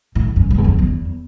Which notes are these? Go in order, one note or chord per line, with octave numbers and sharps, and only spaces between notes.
A2
F#2
G#2
E2
F#2
E2